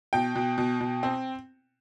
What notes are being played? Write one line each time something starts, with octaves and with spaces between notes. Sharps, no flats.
B2 G5
B2
B2
B2
C4